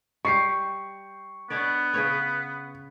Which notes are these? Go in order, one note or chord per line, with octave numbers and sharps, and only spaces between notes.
G3 G4 C#6 C7
B3 D4 C#5 D5
C#3 B4 C#5